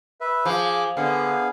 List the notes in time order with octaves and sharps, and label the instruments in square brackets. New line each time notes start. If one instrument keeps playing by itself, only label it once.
[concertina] B4 E5
[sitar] F3 [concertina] G#4 D6
[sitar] D3 [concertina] B3 G#4 F5